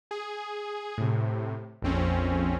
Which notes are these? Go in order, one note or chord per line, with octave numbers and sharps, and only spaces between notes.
G#4
A2 C3
A#1 F2 C4 C#4